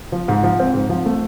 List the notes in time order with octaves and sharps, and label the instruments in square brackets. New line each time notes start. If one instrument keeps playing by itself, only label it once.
[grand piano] F3
G#2
F3
C4
G#2
F3
A3